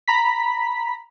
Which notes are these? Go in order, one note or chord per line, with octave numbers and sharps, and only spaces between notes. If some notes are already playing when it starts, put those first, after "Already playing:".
A#5 B5 B6